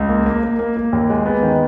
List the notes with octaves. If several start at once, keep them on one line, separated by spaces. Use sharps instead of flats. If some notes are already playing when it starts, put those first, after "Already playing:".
Already playing: C#2
A#3
A#3
A#3
A#3
A#3
D#2
G#3
B3
D#3